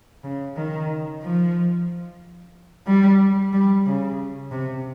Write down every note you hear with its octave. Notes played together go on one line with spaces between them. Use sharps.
C#3
D#3
F3
G3
G3
C#3
C3